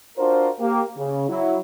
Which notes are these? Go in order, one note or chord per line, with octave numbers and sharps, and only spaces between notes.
D4 F4 F#4 A#4 C5
A#3 G4
C#3
F#3 E4